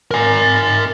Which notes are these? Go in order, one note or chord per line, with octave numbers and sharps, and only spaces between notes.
A#4 G#5